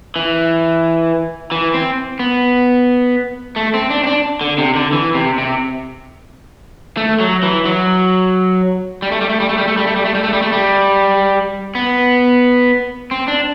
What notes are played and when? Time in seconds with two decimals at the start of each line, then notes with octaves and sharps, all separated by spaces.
0.16 E3
1.51 E3
1.74 C4
2.19 B3
3.56 A3
3.74 C4
3.90 D4
4.03 C4
4.07 D4
4.41 D3
4.58 C3
4.75 D3
4.93 E3
5.15 C3
5.38 C3
6.97 A3
7.20 F#3
7.43 E3
7.66 F#3
9.02 G3
9.12 A3
9.21 G3
9.30 A3
9.40 G3
9.49 A3
9.58 G3
9.68 A3
9.77 G3
9.87 A3
9.96 G3
10.05 A3
10.15 G3
10.24 A3
10.33 G3
10.42 A3
10.52 G3
11.75 B3
13.11 C4
13.28 D4